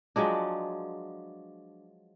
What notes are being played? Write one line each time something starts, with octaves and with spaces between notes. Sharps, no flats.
F3 F#3 G#3 D4